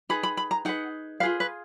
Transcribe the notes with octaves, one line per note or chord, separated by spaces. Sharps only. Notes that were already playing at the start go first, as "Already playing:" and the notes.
D#4 G#4 B4 B5
B5
B5
A#5
D#4 G#4 B4 F#5
F4 G#4 B4 F5
B4